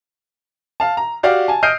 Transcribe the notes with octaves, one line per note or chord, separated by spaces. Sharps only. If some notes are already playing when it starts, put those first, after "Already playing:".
F5 A5
A#5
F#4 G4 D5 F5
G#5 A5
D#5 F6 G6 C7 D7 D#7